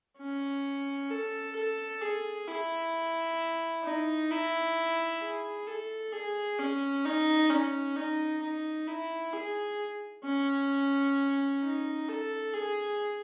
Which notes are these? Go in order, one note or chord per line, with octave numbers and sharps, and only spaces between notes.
C#4
A4
A4
G#4
E4
D#4
E4
G#4
A4
G#4
C#4
D#4
C#4
D#4
D#4
E4
G#4
C#4
D#4
A4
G#4